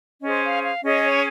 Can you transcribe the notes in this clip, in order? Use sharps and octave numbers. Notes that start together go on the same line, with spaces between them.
C#4 G#4 C5 D#5
F5
F5
C#4 G#4 C#5 D#5
C#5